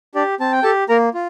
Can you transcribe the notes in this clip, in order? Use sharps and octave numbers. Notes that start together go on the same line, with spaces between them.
D4 G4 D5
C4 A5
G5
G4 A4 A5
A#3 A#4 A#5
F4